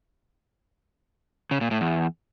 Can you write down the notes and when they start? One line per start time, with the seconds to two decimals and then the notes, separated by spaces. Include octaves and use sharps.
1.51 C#3
1.61 A#2
1.71 A2
1.81 E2